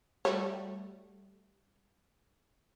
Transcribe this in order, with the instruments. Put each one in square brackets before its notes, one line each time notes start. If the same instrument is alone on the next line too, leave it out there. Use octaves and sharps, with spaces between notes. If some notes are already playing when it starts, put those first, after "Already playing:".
[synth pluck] G3 A3 F#4 [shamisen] C#5